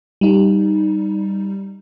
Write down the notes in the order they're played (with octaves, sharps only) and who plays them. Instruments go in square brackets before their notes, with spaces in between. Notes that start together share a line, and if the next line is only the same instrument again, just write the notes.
[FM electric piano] G3 D#4